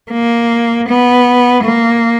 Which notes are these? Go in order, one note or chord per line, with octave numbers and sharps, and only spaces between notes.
A#3
B3
A#3